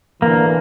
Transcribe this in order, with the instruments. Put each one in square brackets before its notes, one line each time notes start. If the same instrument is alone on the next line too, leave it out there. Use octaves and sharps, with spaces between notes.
[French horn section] D3 E3 [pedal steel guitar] A#3